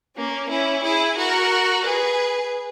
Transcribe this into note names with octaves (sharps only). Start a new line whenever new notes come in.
A#3 C#4
C#4 E4
E4 G#4
F#4 A#4
G#4 B4